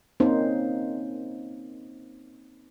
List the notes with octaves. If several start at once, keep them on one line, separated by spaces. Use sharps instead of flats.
A#3 C4 C#4 D#4 C5